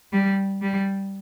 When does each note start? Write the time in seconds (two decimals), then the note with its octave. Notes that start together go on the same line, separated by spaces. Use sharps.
0.13 G3
0.62 G3